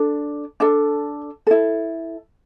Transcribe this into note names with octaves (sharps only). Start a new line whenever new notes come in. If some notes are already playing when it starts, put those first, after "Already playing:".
Already playing: D4 A4
D4 A4 A5
E4 A4